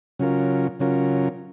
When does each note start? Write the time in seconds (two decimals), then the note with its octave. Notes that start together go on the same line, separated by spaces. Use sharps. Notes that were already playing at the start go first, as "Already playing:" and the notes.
0.19 C#3 F#3 C#4 F4 A#4
0.79 C#3 F#3 C#4 F4 A#4